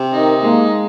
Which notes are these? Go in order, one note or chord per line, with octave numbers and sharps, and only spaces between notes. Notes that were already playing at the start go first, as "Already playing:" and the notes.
Already playing: C3
D#3 D#4
G#3 A#3